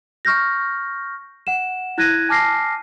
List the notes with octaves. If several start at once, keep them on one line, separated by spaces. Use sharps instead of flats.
C#6 F6 G6 A#6
F#5 E7
E4 F#6 G#6 A#6 D#7
G#5 A5 D6 F6 A#6 C7